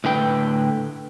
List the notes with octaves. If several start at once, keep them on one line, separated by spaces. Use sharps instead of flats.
A2 D3 B4 G5